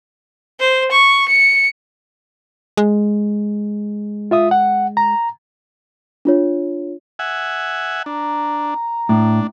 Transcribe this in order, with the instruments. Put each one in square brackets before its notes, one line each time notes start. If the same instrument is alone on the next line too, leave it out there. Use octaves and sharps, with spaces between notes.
[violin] C5
C#6
C#7
[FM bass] G#3
[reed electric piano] F4 E5 D#6
F#5
A#5
[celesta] D4 F4 C#5
[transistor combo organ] E5 F#5 G#5
[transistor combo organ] D4 [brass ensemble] A#5
[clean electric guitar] A2 [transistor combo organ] D4